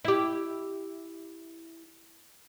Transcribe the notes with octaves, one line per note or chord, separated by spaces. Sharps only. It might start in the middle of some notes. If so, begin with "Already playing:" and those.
E4 G4